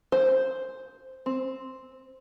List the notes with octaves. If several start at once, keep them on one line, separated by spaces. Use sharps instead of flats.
C5
C4